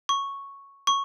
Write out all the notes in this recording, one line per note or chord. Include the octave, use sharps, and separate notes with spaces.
C#6
C#6